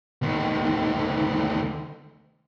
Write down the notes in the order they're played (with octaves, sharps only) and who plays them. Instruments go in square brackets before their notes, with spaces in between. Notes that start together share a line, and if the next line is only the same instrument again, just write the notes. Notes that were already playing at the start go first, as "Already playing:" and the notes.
[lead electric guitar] D2 D#3